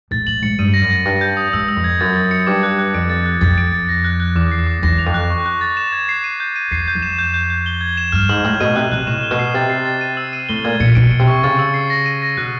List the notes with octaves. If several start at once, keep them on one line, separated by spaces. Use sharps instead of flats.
A2 A6
A2 F#7
G#2 C#7
G2 D#7
A#6
F#2
A#6
G2 A#6
G6
D#6
G#2 E6
E6
F2
G#6
F#2 A6
A6
C#7
G2 D6
F#6
F#6
F2 D7
A6
F#6
F2 A6
D7
A6
A#6
F#6
F#6
E2 D6
C7
D6
E2 A#6
F7
F2
F#6
C#6
F#6
A6
E7
G#6
C7
D#7
G6
D#7
E2 C7
G6
F2
E7
G6
G6
G6
G7
G#6
E7
G2 F6
G#2 F#7
A2 F#7
B2 D#7
C3 F#6
C3 F#6
A2 E7
G7
B2
C7
C3 A6
C7
A6
D#7
E6
D#7
A2 G7
A#2 G#6
A#2 C#7
B2 D7
D7
C3
C#6
C#3 A6
E6
C7
A#6
D#7
A#6
B2 F#6